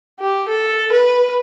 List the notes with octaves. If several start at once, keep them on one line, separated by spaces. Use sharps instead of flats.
G4
A4
B4